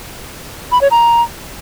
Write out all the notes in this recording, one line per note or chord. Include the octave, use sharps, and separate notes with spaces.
B5
C#5
A#5